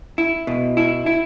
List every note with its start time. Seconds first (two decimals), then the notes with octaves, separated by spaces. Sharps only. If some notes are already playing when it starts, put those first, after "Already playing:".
0.18 E4
0.47 B2
0.77 E4
1.06 E4